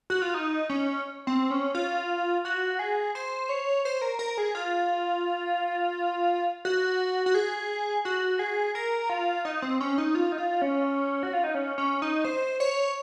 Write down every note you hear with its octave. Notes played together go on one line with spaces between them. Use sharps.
F#4
F4
D#4
C#4
C4
C#4
F4
F#4
G#4
C5
C#5
C5
A#4
A#4
G#4
F4
F#4
F#4
G#4
F#4
G#4
A#4
F4
D#4
C4
C#4
D#4
F4
D#4
F4
C#4
F#4
F4
D#4
C#4
C#4
D#4
C5
C#5